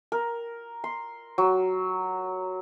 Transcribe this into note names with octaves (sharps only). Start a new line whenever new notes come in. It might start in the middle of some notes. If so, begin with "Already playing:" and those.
A#4
C6
F#3